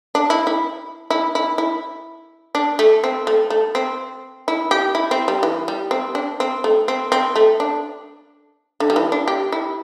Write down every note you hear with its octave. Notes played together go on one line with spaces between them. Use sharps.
D4
E4
E4
E4
E4
E4
D4
A3
C4
A3
A3
C4
E4
G4
E4
C4
G3
E3
G3
C4
D4
C4
A3
C4
C4
A3
D4
D3
G3
E3
D4
G4
E4